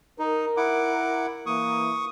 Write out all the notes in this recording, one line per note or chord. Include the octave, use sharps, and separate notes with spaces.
D#4 A#4
E4 F#5 D6
E3 A#3 C#6 D#6